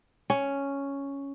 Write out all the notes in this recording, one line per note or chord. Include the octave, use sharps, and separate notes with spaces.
C#4